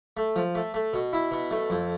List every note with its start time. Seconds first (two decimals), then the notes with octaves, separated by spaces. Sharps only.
0.17 A3
0.36 F3
0.55 A3
0.74 A3
0.93 B2
1.13 E4
1.31 B2
1.51 A3
1.70 F2